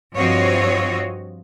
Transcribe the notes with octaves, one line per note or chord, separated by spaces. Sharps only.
G2 F3 C4 F#4 C#5 D#5